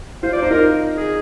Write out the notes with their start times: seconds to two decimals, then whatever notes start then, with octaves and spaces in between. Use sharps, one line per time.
0.23 F4 C5
0.33 D5
0.42 D#4 C5
0.50 F4 A#4
0.97 G#4